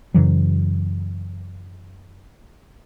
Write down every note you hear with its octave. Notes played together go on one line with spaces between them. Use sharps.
F#2 C#3 E3 F#3